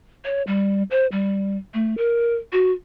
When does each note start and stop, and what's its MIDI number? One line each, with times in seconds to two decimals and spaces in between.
0.25 0.42 73
0.47 0.83 55
0.91 1.07 72
1.12 1.58 55
1.74 1.97 57
1.97 2.35 70
2.53 2.72 66